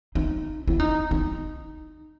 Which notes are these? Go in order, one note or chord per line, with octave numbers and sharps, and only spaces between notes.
D#4
E4
D#4
D#4